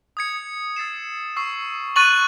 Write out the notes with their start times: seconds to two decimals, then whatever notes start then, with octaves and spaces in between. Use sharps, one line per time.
0.17 D#6 G#6 C#7
0.76 E6 A6 C7 E7
1.36 C#6 E6 C7
1.96 C#6 F#6 A6 D#7 F#7